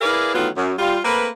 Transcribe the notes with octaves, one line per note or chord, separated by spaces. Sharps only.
E4 G#4 A#4 B4 D5 F5
D#3 E3 F#3 A3 B3 F4
F#2
G3 F4
A3 A#3 C4 A#4 B4